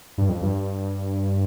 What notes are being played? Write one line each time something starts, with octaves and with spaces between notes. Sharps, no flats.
G2
F2
G2